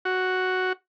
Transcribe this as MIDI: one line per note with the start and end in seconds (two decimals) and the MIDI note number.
0.05 0.73 66